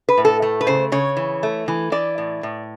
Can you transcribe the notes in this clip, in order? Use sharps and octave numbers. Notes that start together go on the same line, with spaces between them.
B4
A2
A4
A3
B4
C#3 C5
C#3 C#5
E3
A3
E3
E3 D5
A2
A2